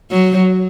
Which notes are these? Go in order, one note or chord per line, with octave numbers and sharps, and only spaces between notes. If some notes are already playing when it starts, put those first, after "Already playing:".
F#3